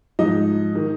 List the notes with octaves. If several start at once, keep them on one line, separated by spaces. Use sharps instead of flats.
G#2 F3 D#4 D#5
D#3